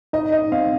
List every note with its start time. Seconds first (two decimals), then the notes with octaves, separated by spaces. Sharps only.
0.13 D#4 D#5
0.32 D#5
0.52 C4 F5